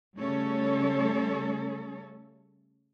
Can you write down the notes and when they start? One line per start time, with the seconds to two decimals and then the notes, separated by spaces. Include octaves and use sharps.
0.18 C#3 G3 A3 C#4 A4 C#5